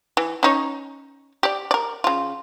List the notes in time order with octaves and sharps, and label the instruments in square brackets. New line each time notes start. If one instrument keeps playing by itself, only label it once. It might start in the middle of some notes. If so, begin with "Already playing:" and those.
[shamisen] E3
C#4 D#4 C#5
G4 D5
A#4 D5
C#3 F4